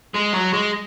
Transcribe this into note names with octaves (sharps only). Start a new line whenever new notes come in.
G#3
F#3
G#3